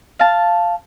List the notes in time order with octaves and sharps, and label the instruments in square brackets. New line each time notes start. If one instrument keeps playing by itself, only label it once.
[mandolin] F5 A5